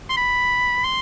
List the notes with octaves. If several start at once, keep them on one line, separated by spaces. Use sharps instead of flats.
C6
B5
C6